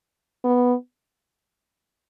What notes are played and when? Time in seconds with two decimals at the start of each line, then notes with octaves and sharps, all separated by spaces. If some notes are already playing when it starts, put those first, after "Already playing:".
0.44 B3